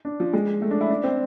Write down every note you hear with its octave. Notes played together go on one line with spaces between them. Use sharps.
D4
F3
G#3
A3
D4
E4
D4
C4